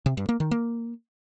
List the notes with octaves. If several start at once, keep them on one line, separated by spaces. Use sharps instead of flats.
C3
G2
A#3
D#3
A#3